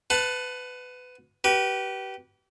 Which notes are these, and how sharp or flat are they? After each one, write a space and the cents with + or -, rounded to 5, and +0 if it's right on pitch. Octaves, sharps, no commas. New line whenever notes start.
B4 +20 F#5 -25 A5 +0
G4 -35 B4 -20